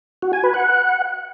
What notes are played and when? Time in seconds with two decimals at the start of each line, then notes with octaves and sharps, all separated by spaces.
0.22 F#4
0.33 G#5
0.43 B4
0.54 F#5